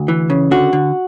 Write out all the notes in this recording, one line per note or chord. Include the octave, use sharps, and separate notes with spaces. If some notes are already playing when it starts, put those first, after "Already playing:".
Already playing: D2
E3
C#3
D3 F#4
D3